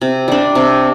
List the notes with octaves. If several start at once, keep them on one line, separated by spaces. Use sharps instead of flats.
C3
G3 D4
C3